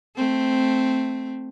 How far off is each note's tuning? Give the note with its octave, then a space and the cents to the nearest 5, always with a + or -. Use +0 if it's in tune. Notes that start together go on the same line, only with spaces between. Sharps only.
A3 +0 C4 +0